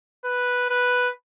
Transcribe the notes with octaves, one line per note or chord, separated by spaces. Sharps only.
B4
B4